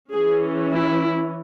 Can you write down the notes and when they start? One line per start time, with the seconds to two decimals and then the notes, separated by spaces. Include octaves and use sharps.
0.13 E3 C#4 G#4
0.71 E4